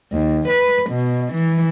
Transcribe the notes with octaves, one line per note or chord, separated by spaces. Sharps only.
D#2
B4
B2
E3